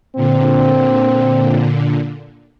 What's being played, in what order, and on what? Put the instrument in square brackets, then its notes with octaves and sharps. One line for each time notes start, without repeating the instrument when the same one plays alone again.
[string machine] A#2 D3 [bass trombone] C4